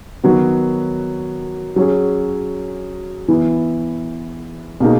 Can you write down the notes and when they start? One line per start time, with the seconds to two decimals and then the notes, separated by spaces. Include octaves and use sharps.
0.24 D#3 F#3 B3 F#4
1.76 F#3 C#4 G#4
3.28 E3 B3 E4
4.80 B2 A#3 D#4 G#4